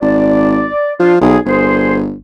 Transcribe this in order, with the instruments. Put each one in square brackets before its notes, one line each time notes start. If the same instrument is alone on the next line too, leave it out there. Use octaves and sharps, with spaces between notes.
[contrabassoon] G#1 [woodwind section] D5
[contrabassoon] F3 [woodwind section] D4 F4
[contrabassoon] B1 [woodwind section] G#4
[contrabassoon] G1 [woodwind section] C2 G#4 C5